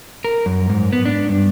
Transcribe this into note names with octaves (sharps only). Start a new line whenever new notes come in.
A#4
F#2
G#2
B3
D4
G2